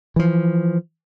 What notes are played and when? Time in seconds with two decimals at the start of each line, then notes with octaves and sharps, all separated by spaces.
0.16 E3 F3